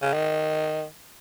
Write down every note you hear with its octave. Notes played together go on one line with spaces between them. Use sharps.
C#3
D#3